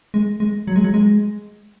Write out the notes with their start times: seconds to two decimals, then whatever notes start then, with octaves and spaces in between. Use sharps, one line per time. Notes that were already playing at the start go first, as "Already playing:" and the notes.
0.14 G#3
0.40 G#3
0.67 F#3
0.76 G#3
0.84 F#3
0.94 G#3